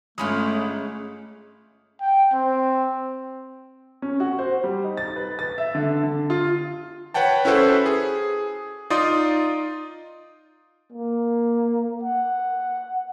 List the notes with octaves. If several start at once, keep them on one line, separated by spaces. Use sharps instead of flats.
G1 G#3 A3 C#4 F4 B5 D#6
G5
C4
C#4
F#4
C5
G3
D#4
A6
B4
A6
E5
D3
D3
F4
B4 C#5 F#5 G5 A5
C#4 E4 F#4 A4 B4 C5
G#4
D#4 F4 D5 C6 D#6
A#3
F#5